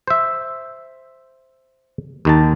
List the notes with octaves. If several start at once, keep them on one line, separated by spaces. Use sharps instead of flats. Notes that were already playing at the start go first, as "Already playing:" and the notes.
C5 E5
D#2 D#3 A5